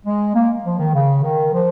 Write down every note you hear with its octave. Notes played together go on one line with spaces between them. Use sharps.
G#3
A#3
F3
D#3
C#3
D#3
F3